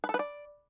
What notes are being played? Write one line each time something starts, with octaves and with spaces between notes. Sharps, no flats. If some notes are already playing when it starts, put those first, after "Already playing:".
B4
A4
B4
D5